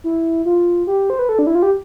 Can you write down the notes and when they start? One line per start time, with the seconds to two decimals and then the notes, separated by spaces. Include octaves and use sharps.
0.04 E4
0.45 F4
0.87 G4
1.10 C5
1.19 B4
1.29 A4
1.39 D4
1.47 E4
1.55 F4
1.63 G4